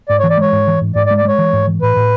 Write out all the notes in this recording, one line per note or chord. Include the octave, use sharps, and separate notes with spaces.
G#2 D5
C#5
E3
D5
G#3 C#5
G#2
E3
G#2
G#2 D5
D5
G#3
D5
G#3 C#5
E3
G#2
E3
A2 B4
A2